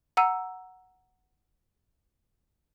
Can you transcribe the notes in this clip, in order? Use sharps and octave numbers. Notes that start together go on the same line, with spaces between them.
F#5 A#5 E6 D#7